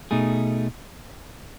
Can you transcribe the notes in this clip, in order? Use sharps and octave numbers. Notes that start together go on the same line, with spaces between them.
B2 A3 D#4 G#4